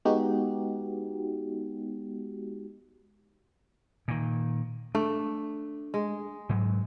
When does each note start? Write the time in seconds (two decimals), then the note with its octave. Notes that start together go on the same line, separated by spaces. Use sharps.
0.05 G#3 B3 D#4 F#4 G4
4.08 A#2 D#3
4.95 A3 D4
5.94 G#3
6.49 G#2 F#3